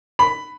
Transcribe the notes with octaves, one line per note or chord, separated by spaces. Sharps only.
B5